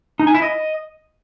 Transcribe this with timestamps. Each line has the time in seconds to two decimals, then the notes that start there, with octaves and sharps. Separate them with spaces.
0.19 D#4
0.27 G#5
0.34 E4
0.42 D#5